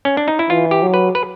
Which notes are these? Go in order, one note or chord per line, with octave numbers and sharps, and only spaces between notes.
C#4
D4
D#4
E4
E3 F4
G4
F#3
B4
B4